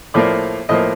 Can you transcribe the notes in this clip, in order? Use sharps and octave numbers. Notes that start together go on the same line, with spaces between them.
A2 F3 A#3 D5
A2 F3 A#3 D#5